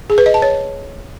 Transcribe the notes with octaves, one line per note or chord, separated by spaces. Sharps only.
G#4
B4
D#5
A5
C#5